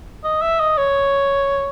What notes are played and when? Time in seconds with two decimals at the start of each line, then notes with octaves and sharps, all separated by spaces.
0.24 D#5
0.42 E5
0.60 D#5
0.78 C#5